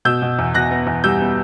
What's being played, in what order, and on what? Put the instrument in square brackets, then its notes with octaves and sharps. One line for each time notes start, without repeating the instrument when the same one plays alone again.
[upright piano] B2 E6 G6
B2
E2
B2 F#6 A#6
B3
E2
G3 E6 G6
B3